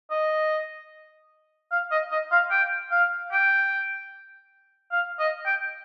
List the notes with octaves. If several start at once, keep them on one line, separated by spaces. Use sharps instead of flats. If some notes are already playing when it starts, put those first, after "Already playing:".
D#5
F5
D#5
D#5
F5
G5
F5
G5
F5
D#5
G5